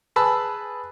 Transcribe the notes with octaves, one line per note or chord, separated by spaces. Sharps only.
G#4 B4 A5 B5 E6